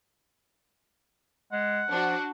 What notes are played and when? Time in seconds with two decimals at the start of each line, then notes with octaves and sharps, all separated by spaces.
1.52 G#3 F#5
1.90 F3 D4 F#4